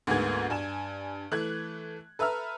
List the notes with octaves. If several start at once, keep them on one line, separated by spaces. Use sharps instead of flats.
D2 G#2 A#3 B3 G#4 G#6
G2 G#5 E7
E3 A3 F#6 G#6
A4 B4 E5 A#5 E6 F6